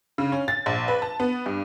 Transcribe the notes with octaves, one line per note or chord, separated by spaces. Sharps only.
C#3
C#4
A6
A#1
B4
A5
B3
G2